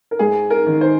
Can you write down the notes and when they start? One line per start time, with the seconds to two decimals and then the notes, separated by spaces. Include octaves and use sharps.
0.11 A#4
0.19 G#2 G#4
0.50 A#4
0.66 D#3
0.81 C5